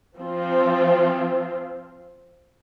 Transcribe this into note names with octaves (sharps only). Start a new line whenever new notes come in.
F3 C4 F4